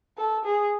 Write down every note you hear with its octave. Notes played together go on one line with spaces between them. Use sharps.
A4
G#4